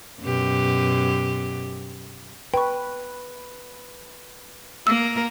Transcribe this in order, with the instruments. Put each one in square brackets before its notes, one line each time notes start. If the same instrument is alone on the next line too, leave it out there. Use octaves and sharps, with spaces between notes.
[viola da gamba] F#2 B2 G4
[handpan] B4 [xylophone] G5 C#6
[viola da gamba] A#3 A#4 [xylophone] E6